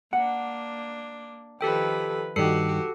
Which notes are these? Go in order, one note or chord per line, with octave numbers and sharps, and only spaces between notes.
A#3 D4 F#5
D#3 F3 G4 A4 B4 G5
G2 D#3 F#4 G4 A4 C7 C#7